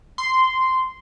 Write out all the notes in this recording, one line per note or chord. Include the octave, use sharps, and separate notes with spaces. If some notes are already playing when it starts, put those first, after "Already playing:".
C6